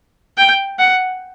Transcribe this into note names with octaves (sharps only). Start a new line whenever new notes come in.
G5
F#5